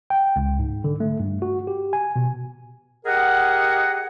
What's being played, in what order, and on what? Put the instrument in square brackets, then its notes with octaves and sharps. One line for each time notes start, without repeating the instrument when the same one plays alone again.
[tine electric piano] G5
C#2
G#2
D3
A3
G2
F#4
G4
G#5
B2
[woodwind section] G4 G#4 A#4 D#5 F#5